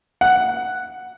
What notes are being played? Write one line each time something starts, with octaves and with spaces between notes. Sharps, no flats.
F#5